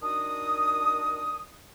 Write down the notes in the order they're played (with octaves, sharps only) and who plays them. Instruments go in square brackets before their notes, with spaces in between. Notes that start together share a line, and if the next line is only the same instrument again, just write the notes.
[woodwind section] D#3 D4 F#4 D#6